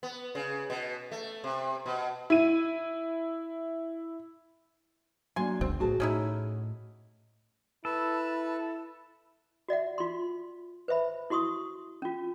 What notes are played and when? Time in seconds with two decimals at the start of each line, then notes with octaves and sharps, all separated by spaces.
0.03 B3
0.35 C#3
0.70 B2
1.11 A3
1.44 C3
1.86 B2
2.30 E4 D#7
5.36 F#3 A#3 D4 G#5 C6
5.61 F#1 C#2 B2 C4
5.80 B1 A2 F#4 G#4 A5
6.00 A2 C#4 D#4 E4
7.85 E4 A4 B4
9.69 F#4 D5 E5 F#5
9.98 F4 C6
10.88 B4 C5 E5 B5
11.30 E4 F#4 C6 C#6 D#6
12.02 C#4 F4